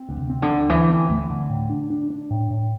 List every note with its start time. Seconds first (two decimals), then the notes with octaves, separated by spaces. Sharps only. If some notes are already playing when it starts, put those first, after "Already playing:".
Already playing: C4
0.09 D2
0.17 C3
0.30 C4
0.42 D3
0.50 D2
0.69 D2 E3
0.89 C4
1.10 D2 A3
1.30 D3
1.49 A2
1.70 D4
1.90 D4
2.10 D4
2.30 A2
2.50 A2